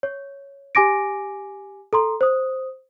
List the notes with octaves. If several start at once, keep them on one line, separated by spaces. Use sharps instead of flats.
C#5
G4 G#5 D6 A#6 D7
A4 A#5 C6
C5 D#6